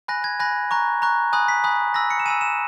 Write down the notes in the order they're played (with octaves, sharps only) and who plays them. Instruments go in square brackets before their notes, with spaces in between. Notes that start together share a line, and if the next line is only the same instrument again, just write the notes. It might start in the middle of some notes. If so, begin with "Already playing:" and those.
[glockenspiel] G#5 B5 F#6 A#6
G#6
G#5 B5 F#6 A#6
A#5 C#6 F#6
A#5 C#6 F#6
G#5 B5 D#6 F#6
B6
G#5 B5 D#6 F#6
G#5 B5 E6 A#6
C#7
E7
G#5 B5 E6 D#7
E7